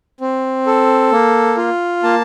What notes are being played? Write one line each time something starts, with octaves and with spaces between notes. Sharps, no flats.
C4
A4
A#3
F4
A#3 A5